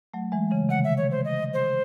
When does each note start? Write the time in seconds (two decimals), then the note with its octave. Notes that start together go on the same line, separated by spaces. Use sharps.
0.14 F#3 A3
0.32 E3 G#3
0.51 C#3 E3
0.69 C3 D#3 F#5
0.84 E5
0.97 C#5
1.11 C5
1.25 D#5
1.54 C5